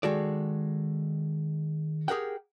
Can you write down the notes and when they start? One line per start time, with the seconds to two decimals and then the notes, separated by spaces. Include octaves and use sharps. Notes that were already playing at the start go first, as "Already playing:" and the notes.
0.03 D#3 G#3 F#4 A4 D5
2.08 G4 G#4 A#4 F#5 G5